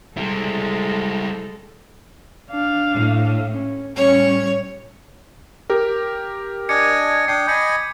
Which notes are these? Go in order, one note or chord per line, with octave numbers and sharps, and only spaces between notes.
G3 G#3 E4 A4
D4 F5
A2
C#4
A2 G3 C#4 C#5
G4 A#4
D4 D#5 G#5 D6 G#6 C#7
D4 G5 D#6 C7
D#5 G#5 B5 G6 C#7